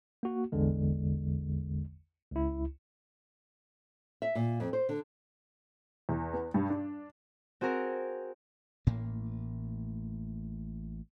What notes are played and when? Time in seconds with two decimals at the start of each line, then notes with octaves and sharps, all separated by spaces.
0.23 A#3 F#4
0.52 A1 E2 D3 G#3
2.31 C#2 E4
4.22 E5
4.35 A#2
4.60 F2
4.73 C5
4.89 D3
6.09 E2
6.33 B3
6.54 G2
6.70 D4
7.61 C4 F#4 G#4 A#4
8.87 A1 A2 A#3